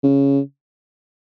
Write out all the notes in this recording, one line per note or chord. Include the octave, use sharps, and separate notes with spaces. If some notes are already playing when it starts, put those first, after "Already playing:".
C#3